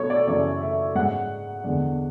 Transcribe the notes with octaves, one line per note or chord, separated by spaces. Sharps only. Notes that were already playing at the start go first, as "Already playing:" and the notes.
Already playing: B2 F#3 B3 D4 A4 C#5
D5
F#2 C#3 E3 D5
E5
G#2 G#3 C#4 F#5
E2 D3 G#3 D4